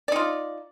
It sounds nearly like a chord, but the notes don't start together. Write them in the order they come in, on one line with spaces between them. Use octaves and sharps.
D5 D#4 F4